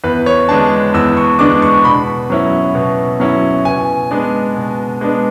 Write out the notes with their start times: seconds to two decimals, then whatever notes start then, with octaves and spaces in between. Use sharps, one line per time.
0.04 E2 B4
0.26 C#5
0.49 D3 G#3 B3 D4 A5
0.94 E2 E6
1.17 C#6
1.39 D3 G#3 B3 D4 D6
1.62 C#6
1.85 B2 B5
2.30 F#3 C#4 E4
2.75 B2
3.20 F#3 C#4 E4
3.65 B2 G#5
4.11 G#3 B3 D4
4.56 B2
5.01 G#3 B3 D4